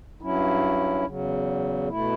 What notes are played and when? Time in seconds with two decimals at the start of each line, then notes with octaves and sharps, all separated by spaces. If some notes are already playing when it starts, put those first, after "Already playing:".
0.21 G2 F#3 C#4 E4
1.06 E2 C#3 F#3
1.89 B2 A3 E4